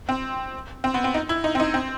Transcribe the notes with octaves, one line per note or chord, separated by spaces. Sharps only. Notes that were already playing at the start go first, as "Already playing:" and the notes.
C4
C4
B3
C4
D#4
E4
D#4
C4
D#4
C4